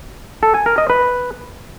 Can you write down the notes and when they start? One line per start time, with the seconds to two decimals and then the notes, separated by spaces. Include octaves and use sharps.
0.43 A4
0.54 G#5
0.66 A#4
0.78 D#5
0.90 B4